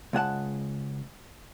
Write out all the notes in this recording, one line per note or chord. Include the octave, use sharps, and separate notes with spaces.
C#2 G#3 F#5 A5